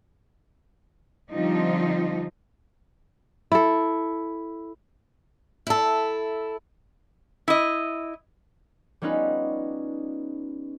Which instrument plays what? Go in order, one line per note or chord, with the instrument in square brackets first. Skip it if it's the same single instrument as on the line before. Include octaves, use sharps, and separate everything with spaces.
[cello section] D3 F3 G3 C4 D#4 F4
[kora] E4 A4
[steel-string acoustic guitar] E4 A4
[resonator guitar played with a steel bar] E4 D#5
[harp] G3 B3 C#4 D#4 F4 B4